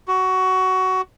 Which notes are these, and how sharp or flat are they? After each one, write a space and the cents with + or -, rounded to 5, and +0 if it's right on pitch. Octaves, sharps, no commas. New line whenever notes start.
F#4 +15